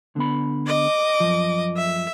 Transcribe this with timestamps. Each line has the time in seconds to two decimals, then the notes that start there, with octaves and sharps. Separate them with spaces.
0.16 D3 B3 B5
0.67 D#5 D6
1.20 F#2 F3
1.77 E5